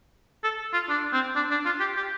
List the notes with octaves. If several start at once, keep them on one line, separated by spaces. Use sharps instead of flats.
A4
F4
D4
C4
D4
D4
F4
G4
G4